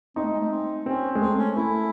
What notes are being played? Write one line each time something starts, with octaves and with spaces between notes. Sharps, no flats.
C4 D#4
A3
G#3
A3
C4
C4 C#4
G#3
A3 C4
C#4
A3 E4